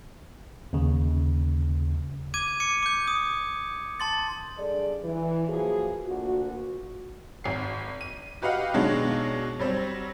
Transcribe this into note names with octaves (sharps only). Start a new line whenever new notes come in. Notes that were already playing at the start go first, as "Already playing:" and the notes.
D#2 C#3
D6 G#6 D#7
D6 C#7 D#7
D6 G6
D#6
A5 C6 A6
G2 G#4 A4 D5
E3
F3 F#3 A#3 G#4
D2 A#2 F#4
G#1 C7
D#7
F#4 G4 B4 D#5 F5 F#5
B2 D#3 F#3 G#3 D4
F#3 G3 C4